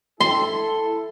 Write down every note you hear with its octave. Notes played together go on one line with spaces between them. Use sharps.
E4 A4 C6